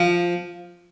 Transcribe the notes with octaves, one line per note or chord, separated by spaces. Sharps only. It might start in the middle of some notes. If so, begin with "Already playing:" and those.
Already playing: F3